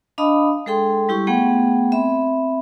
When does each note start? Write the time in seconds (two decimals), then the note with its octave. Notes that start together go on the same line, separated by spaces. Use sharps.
0.18 D4 D#5 F5 A5 B5 D#6
0.66 G#3 G#4 A4 G5 C6
1.09 G3 E4 G4 C#6
1.27 A3 B3 G#4 F#5 G5
1.92 C4 E5 B5